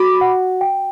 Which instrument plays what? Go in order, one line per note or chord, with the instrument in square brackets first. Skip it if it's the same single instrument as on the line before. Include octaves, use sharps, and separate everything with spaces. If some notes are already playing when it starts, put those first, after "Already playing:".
Already playing: [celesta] F#4 [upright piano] B5 D6
[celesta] F#5
G5